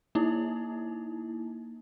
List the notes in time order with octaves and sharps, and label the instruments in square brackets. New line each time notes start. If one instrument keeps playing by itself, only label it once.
[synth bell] A#3 D#4 E4